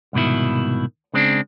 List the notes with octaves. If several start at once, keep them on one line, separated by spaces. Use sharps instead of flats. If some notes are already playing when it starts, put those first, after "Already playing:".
C2 G#2 B2 D#3 E4
C#3 G#3 C4 D4